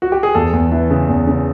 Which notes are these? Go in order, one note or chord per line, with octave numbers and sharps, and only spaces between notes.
F#4
G4
G#4
E2 A4
E2
E3
C#3
E2
C#3